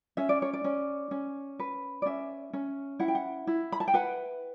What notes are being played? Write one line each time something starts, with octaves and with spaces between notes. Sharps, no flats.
C#4 E5
D5
C#5
D5
C#4
C#4
B4
D5
C#4 E5
C#4
E4 F#5
G5
F#5
E4
B5
A5
G5
B4 F#5